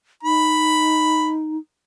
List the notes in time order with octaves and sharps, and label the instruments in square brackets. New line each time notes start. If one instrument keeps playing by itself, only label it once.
[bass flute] D#4 [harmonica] B5